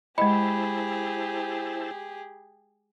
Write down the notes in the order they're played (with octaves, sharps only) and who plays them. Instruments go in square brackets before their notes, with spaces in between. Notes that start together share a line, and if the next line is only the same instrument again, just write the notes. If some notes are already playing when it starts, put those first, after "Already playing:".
[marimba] G#3 D#5 [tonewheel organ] E4 C5 A5 [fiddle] G4 G#4 [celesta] B5